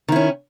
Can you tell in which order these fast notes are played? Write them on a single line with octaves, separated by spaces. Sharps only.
D#3 E4 C#4